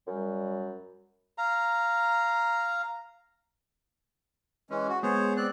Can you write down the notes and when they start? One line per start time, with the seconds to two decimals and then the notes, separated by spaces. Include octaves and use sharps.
0.07 F#2 G3
1.38 F5 A#5
4.70 E3 G#3 C#4
4.89 F#4
5.03 G#3 B3 G#4 C5 C#5
5.37 C4 D5 F#6